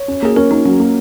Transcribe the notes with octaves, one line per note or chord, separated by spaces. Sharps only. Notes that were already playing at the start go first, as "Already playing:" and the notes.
Already playing: C#5
C#4
A#3 G#4
C#4 A#4
A#3 D#4
F#3 C#4
A#3